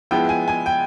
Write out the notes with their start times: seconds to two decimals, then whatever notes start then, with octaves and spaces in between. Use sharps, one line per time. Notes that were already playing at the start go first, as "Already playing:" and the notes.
0.11 F3 G#3 B3 E4 G5
0.29 G#5
0.48 G#5
0.66 G5